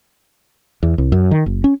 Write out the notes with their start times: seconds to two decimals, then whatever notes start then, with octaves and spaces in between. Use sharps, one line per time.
0.83 E2
0.98 C2
1.12 F#2
1.31 D#3
1.46 F#1
1.64 C#4